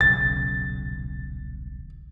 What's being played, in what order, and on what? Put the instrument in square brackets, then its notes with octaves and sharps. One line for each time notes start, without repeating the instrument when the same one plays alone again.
[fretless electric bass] D#1 B1 C#3 [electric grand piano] A6